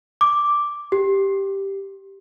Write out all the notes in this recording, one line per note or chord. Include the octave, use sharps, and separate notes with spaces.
D6
G4